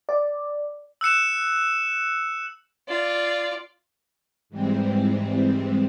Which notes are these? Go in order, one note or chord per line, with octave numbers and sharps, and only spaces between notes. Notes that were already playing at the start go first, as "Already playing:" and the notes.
D5
E6 F#6 C#7 E7
F4 D5
G#2 E3 G3 G#3 C4